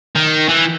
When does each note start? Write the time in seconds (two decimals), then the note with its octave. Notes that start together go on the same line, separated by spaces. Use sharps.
0.15 D#3
0.49 E3